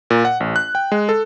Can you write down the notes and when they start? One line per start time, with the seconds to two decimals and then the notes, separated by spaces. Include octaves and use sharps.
0.10 A#2
0.25 F#5
0.40 A1
0.56 F#6
0.75 G5
0.92 G#3
1.09 A4